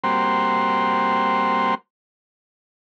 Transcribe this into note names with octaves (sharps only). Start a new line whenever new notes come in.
G3 A#3 C4 F#4 C5